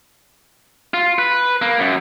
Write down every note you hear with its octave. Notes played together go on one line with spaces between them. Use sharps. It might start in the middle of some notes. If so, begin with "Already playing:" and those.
F4
B4
A#3
F#2